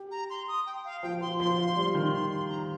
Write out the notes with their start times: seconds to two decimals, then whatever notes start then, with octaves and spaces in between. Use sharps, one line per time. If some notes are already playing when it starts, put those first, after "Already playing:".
Already playing: G4
0.11 A#5
0.30 C6
0.48 D#6
0.67 G5
0.85 F5
1.03 F3 G5
1.21 F3 C6
1.39 F3 C6
1.58 F3
1.76 G3
1.95 D#3
2.13 C6
2.31 C6
2.50 A#5